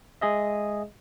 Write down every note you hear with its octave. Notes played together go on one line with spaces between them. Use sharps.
G#3 G#4 D#5 E5